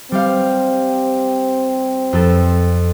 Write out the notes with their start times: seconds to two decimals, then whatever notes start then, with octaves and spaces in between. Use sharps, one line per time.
0.12 G3 C4 G4 F5
2.13 F2 A4